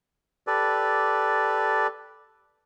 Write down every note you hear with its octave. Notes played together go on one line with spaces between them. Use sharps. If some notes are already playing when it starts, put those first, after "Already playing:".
G4 A4 B4 D5